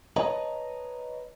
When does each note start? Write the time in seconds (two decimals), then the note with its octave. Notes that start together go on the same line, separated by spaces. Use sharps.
0.16 B4 C#5 D#5 A5 A#5